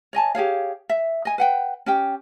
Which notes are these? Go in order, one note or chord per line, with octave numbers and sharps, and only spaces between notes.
C#5 D#5 G#5 A5
G4 G#4 C#5 F5
E5
D#5 G#5
B4 F#5 G5
C#4 G4 G5